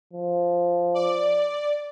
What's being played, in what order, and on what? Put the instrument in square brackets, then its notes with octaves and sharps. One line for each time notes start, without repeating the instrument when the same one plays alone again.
[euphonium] F3
[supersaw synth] D5